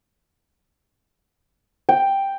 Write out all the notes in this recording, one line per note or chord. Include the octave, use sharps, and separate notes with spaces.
G5